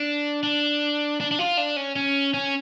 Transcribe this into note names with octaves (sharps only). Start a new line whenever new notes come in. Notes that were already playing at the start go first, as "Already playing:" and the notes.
Already playing: D4
D4
D4
D4
F4
D4
C#4
C#4
C#4